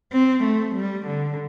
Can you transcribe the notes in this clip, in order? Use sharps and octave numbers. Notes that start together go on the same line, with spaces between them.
C4
A3
G3
D3